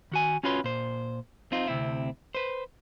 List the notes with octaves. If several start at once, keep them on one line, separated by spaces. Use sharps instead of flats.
D#3 F#4 G#5
C#4 F4 F#4 B4 C#5 C6
A#2 C5
C4 D#4 F4
D2 C3 C4 E4
B4 C5